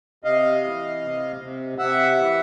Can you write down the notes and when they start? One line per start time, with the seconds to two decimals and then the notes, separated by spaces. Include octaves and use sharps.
0.24 C3 D#5 F5
0.63 E3
1.02 C3
1.40 C3
1.78 C3 E5 F#5
2.17 E3